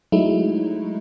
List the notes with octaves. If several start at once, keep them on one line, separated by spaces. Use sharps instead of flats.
F#3 G#3 A3 D#4 E4